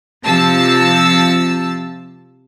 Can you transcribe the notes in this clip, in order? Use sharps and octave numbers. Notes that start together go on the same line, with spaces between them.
C3 F3 A5 E6